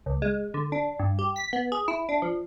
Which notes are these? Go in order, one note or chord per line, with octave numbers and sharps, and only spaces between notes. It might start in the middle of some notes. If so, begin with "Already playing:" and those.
C#2
G#3
D3
D4
G2
G4
B6
B3
G#4
E4
D4
F3